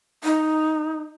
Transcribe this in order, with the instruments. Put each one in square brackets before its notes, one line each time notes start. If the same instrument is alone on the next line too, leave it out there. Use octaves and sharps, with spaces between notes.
[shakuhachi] D#4